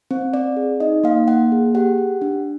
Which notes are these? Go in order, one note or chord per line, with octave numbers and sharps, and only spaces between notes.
C4
C4 D5
G#4
D#4 D#5
A#3 F5
A#3 F#5
G#4
G4 F#5
G4
D4